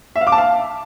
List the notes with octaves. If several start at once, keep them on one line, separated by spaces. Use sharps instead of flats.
E5
F5
D6
A5
F5